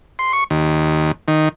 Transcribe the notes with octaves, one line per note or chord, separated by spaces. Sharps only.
C6
C#6
D#2
D#3